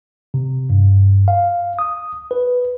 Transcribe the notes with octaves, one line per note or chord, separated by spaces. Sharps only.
C3
G2
F5
D#6
B4